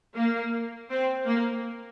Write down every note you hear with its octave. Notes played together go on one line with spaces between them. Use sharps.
A#3
C4
A#3